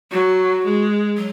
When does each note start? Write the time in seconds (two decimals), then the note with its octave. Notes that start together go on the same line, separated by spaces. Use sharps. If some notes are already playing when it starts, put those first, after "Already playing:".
0.11 F#3 F#4
0.65 G#3
1.17 F#3